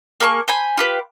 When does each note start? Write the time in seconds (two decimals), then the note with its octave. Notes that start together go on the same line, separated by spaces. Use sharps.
0.20 A#3 G#4 B5 C#6
0.48 C5 G#5 B5
0.77 F4 G4 B4